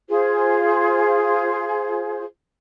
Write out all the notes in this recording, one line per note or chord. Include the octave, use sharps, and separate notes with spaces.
F4 G#4 C5